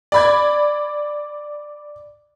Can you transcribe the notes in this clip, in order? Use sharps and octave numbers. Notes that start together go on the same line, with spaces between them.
D5 B5 G#6